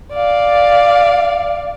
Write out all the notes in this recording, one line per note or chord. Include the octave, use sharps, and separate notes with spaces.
D5 F5